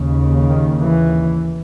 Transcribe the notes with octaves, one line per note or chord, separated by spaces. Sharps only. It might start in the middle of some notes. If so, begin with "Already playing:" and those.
Already playing: D#2 C#3
D#3
E3